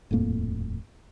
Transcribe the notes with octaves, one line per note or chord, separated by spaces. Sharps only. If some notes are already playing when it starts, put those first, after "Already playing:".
D#1 F2 A2 A#3